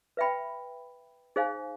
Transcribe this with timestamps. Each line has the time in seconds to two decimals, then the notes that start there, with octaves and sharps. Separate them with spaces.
0.17 B4 E5 G5 B5
1.36 D#4 G#4 C5 F5 G#5